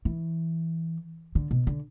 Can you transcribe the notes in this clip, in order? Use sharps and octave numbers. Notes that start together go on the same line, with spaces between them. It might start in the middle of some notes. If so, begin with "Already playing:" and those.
E3
D3
B2
D3